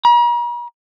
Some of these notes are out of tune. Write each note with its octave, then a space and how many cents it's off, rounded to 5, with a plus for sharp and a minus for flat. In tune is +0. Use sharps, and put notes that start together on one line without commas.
A#5 +45